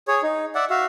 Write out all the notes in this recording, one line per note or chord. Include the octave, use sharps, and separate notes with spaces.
G#4 C#5
D#4
D5 E5 F#5
F#4 E5 F5